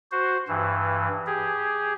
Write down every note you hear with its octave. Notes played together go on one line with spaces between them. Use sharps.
F#4 C5
G2 E3
G4 G#4